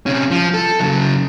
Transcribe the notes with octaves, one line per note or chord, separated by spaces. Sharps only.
C3 C#4
F3
A4
C#3 F#3